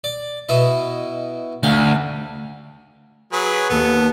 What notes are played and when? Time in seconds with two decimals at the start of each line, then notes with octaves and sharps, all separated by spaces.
0.04 D5
0.49 B2 E4 D#5
1.63 D2 F5
3.33 F#3 G#4 B4
3.70 D#2 B3 A4